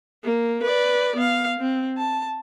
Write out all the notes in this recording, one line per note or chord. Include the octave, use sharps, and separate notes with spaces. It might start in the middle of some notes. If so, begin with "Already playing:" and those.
A#3
B4 D5
B3 F5
C4
A5